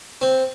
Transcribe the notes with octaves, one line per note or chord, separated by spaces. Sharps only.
C4